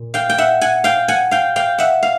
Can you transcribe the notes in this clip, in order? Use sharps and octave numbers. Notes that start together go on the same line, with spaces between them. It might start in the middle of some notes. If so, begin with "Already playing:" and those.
Already playing: A#2
F5 G5
G5
E5 F#5
F#5 G#5
F5 G5
F#5 G#5
F5 G5
F5 G5
E5 F#5
F5